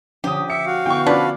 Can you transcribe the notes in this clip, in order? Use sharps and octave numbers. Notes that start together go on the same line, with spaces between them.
D3 F3 C#4 G4 D#6
E5 C#7
F#4 F5
D3 B3 E4 G5 C#6
F3 C#4 D4 F4 B4 D5